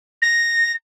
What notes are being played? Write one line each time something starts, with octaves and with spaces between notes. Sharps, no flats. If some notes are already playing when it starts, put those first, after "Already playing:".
A#6